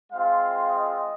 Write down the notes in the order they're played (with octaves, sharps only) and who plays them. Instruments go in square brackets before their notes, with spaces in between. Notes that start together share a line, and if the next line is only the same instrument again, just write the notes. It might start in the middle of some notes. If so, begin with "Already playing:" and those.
[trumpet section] G#3 C4 F4 F5
D#5